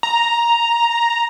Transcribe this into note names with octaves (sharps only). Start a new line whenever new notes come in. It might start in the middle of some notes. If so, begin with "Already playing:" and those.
A#5